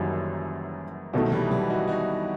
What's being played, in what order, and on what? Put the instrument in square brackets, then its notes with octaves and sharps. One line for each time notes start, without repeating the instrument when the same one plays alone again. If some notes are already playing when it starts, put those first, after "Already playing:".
Already playing: [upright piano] F#1 F#2 D#3 F#3 [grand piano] E3 G3
[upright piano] C2 B2 A3 [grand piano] D#3 F#3
[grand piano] E3 G3
E3 G3
D#4 F#4
D#4 F#4